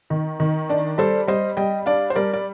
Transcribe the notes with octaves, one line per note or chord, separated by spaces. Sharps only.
D#3
D#3
D4
G3 A4 C5
G3 C5 D#5
G3 D#5 G5
D4 D5 F5
C5
G3 A#4 D5
D5